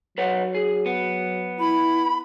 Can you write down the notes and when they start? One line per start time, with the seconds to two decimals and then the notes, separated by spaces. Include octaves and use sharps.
0.18 F#3 B4 C#5 F#5
0.55 G#4
0.86 B3
1.59 E4 B5